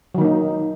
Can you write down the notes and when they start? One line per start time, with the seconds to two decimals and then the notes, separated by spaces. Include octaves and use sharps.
0.15 F#3
0.18 D#3
0.21 A#3
0.25 D#4